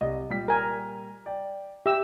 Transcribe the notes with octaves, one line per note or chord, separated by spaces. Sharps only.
C2 D#5
A#2 G3 B6
A#4 G#5
D5 G5
G4 E5 E6